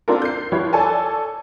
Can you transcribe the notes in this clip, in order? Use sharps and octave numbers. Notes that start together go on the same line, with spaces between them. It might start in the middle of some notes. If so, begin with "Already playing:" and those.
C4 D4 F4 A4 A#4
G6 C7
F3 E4 G4 B4 C#5
A4 C#5 D5 G#5 A5